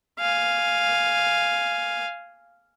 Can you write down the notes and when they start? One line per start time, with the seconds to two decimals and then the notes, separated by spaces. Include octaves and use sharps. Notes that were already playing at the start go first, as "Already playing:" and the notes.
0.20 F5 G#5